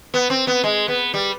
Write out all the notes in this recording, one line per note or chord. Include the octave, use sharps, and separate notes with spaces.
B3
C4
B3
G#3
B3
G3